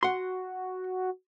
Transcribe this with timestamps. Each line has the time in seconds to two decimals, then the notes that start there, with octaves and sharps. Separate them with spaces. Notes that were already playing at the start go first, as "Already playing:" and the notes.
0.03 F#4 F#5 C6